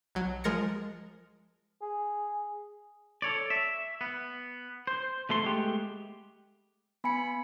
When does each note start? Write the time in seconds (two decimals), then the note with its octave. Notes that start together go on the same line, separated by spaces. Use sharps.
0.15 B1 F#3
0.44 F3 G#3 A#4 A6 A#6 C#7
1.82 G#4
3.22 A4 C#5 D5
3.50 E5
4.01 B3
4.87 C5
5.29 B2 A3 A4 C6
5.43 G#3 A3 B3 G4
7.04 B3 G#5 B5 C#7